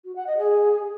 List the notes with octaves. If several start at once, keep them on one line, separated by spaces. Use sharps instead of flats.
F#4
F#5
D#5
G#4